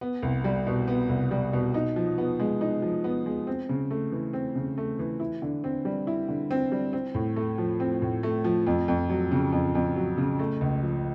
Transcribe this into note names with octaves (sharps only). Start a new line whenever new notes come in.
B3
C2
G3
B2
B3
C2
G3
B2
D#4
F3
B3
G#3
D#4
F3
B3
G#3
C4
C#3
A3
E3
C4
C#3
A3
E3
E4
D3
C4
G3
E4
D3
C4
G3
C4
A2
A3
F3
C4
A2
A3
F3
F2
F2
F#3
C#3
F2
F2
F#3
C#3
A3
C#2
F3